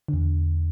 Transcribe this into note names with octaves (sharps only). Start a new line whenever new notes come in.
E2 D3